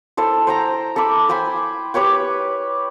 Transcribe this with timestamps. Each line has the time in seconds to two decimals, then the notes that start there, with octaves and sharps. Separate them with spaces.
0.17 E4 A4 C5
0.47 C5 G5 A#5
0.96 A4 E5 B5 D6
1.29 C5 G5 G#5 B5
1.94 G4 B4 C#5 G5